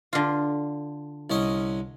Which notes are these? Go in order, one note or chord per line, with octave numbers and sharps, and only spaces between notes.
D3 F4
C2 C#4 D#5